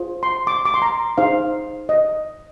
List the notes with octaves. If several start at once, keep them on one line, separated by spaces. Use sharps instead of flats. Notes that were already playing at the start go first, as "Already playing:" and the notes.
Already playing: F4 G#4 C5
C6
D6
D6
C6
A#5
D#4 G#4 C5 F5
D#5